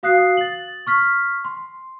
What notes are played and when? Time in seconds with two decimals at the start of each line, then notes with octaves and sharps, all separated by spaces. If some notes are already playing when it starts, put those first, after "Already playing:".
0.03 F#4 F5 D#6 F#6 C7
0.37 A6 F#7
0.87 C#6 F6 B6
1.45 C6